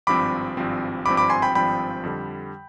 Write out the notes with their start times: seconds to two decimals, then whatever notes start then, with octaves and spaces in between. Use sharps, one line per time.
0.07 G#1 G2 F3 C4 B5 D6
0.57 G#1 G2 F3 C4
1.06 G#1 G2 F3 C4 B5 D6
1.17 B5 D6
1.30 G#5 C6
1.42 G5 B5
1.55 G#1 G2 F3 C4 G5 B5
2.03 F2 D3 G3